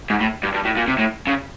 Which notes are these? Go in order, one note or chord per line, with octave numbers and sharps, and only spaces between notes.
G#2
A2
G2
G2
A2
A#2
C3
A2
C#3